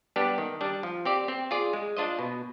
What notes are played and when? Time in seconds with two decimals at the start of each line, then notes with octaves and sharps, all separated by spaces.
0.16 G3 B3 D4 G4
0.38 D#3
0.61 G3 D4
0.83 F3
1.05 C4 G4 D5
1.28 C4
1.51 F4 G#4 D5
1.73 G#3
1.97 D4 F4 C5 D#5
2.19 B2